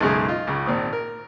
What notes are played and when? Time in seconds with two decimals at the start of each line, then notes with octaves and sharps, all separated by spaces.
0.01 B1 F#2 C#3 G#3 G#4
0.28 F4 D#5
0.47 C#2 C#3
0.66 G#1 A#2 C4 D#6
0.93 A#4